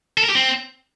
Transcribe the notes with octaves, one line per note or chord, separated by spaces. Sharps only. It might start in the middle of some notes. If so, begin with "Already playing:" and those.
A4
A#4
G4
C4